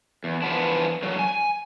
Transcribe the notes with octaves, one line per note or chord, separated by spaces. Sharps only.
E2
E3 F3 B3 D4
D3 F#3
G#5